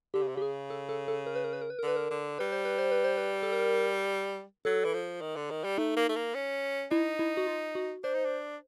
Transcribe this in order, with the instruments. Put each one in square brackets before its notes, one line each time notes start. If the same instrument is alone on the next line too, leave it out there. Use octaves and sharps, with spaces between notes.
[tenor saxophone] D3 [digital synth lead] G4
[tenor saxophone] C#3
C3
[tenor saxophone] C#3 [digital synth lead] G4
[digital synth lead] G#4
A4
A4
A4
A#4
B4
A#4
B4
A#4
B4
A#4
[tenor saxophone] D3 [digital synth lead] B4
[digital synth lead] A#4
[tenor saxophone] D3
[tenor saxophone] G3 [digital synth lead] B4
[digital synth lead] C5
B4
C5
B4
C5
B4
A4
A#4
[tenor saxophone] F#3 [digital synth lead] A4
[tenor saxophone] E3
F3
D#3
D3
D#3
G3
[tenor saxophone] A3 [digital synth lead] D#4
[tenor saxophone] A#3
A3
A#3
C#4
[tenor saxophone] D#4 [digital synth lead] E4
[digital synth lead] E4
F#4
F4
F#4
[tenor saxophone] D4 [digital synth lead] C5
[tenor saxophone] D#4
D4